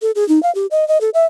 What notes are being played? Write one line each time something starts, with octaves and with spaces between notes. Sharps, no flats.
A4
G#4
D#4
F5
G4
D#5
D#5
A4
E5